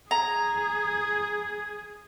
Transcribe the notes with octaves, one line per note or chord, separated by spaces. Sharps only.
G#4 A#5